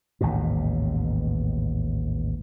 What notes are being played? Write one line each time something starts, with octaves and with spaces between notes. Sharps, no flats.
A1 D#2 G#2 B2